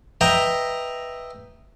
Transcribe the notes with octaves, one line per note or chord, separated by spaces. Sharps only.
B4 D#5 E5 G5 A#5